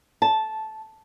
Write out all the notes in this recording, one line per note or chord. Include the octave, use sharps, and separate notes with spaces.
A5